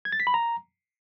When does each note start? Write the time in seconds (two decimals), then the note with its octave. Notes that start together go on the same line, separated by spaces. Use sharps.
0.05 G#6
0.12 A6
0.20 B6
0.27 B5
0.34 A#5